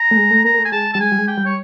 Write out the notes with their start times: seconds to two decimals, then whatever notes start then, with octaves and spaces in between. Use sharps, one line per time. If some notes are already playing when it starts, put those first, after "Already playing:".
Already playing: A#5
0.11 A3
0.17 G#3
0.31 A3
0.44 A#3 A#5
0.54 A#3
0.58 A3
0.65 G#5
0.72 G#3 A5
0.93 G3 A5
1.00 G#3 G#5
1.12 G3
1.19 G#3
1.28 G5
1.37 G3
1.45 C#5